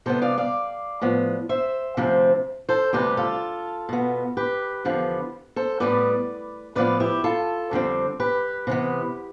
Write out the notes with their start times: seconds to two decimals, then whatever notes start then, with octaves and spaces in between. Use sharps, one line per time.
0.06 C3 G3 B3 A4 C5
0.22 D5 F5
0.38 D5 F5
1.01 A2 F3 B3
1.49 C5 E5
1.97 D2 C3 F3 C4
2.69 A4 C5
2.93 D2 C3 G3 G4 B4
3.17 F4 A4
3.89 B2 B3
4.37 G4 B4
4.85 E2 D3 F3 B3
5.56 A4 C5
5.80 A2 G3 B3 B4 D5
6.75 A2 F3 B3 B4 D5
7.00 E4 G4
7.24 F4 A4
7.71 F2 D3 G3 C4
8.20 G4 B4
8.67 C3 E3 B3